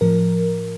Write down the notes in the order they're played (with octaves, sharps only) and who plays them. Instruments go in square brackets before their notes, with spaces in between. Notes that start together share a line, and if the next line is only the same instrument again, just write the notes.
[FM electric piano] A2 F3 A#4